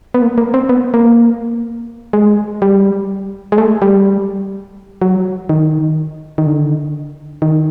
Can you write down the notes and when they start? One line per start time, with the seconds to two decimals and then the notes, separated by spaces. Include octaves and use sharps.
0.14 B3
0.22 A#3
0.38 A#3
0.54 C4
0.69 B3
0.94 A#3
2.13 G#3
2.62 G3
3.52 G#3
3.58 A3
3.82 G3
5.02 F#3
5.49 D#3
6.38 D#3
6.46 D3
7.42 D#3